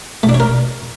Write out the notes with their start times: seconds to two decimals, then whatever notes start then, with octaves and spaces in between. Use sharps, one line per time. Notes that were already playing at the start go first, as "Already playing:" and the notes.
0.23 A3
0.29 D4
0.34 C#5
0.40 A#4